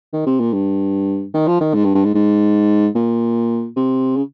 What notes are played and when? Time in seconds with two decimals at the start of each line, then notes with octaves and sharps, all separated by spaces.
0.13 D#3
0.26 C3
0.40 A#2
0.53 G2
1.34 D#3
1.47 F3
1.61 D#3
1.74 G#2
1.84 G2
1.94 G2
2.04 G#2
2.15 G#2
2.95 A#2
3.76 C3
4.16 C#3